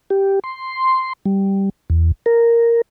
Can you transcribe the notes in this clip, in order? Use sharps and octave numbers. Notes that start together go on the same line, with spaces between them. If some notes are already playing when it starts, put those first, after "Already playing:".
G4
C6
G3
E2
A#4